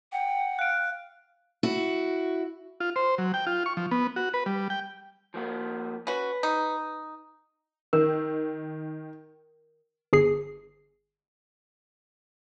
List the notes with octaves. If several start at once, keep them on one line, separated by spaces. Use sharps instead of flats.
F#5 G5
F5 F#6 D7
E4 F#4
F4
C5
F#3
G5
F4
C#6
F3
B3
F#4
B4
G3
G5
F3 A#3 F#4
C#4 F#4 B4
D#4
D#3 A#4
G1 G#4 C7